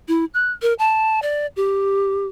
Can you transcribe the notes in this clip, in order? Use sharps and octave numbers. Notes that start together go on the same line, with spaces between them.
E4
F#6
A#4
A5
D5
G4